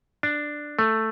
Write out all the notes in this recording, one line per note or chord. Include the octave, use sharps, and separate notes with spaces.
D4
A3